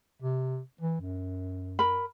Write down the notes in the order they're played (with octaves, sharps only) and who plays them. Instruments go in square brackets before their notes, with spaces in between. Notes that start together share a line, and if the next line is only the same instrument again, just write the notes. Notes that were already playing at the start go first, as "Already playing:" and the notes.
[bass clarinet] C3
E3
F#2
[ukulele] A#4 B5